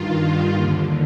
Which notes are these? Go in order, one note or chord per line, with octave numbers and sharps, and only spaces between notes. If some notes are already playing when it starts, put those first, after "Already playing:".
Already playing: G2 D#3 F4
D#2 D3